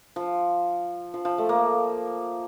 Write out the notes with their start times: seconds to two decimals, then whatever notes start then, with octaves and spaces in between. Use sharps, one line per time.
0.16 F3
1.14 F3
1.25 F3
1.38 A3
1.49 A#3